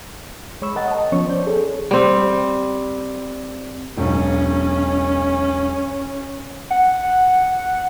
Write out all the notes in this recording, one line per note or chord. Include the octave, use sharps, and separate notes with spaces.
G#3 C#5 B5 C#6 E6
A#4 D#5 F#5 G5 A6
D#5 A5
F3 B3 C#4 C#5 C#6
C5 D5 G6
G#4 A4 C#5
G3 C4
E1 B1 C#4
F#5